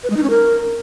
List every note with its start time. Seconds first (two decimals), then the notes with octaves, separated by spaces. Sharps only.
0.03 B4
0.10 G#3
0.17 D#4
0.23 C#4
0.30 A#4